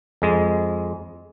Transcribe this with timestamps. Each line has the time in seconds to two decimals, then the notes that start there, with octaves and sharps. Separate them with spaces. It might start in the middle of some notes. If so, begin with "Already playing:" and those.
0.22 F2 G#3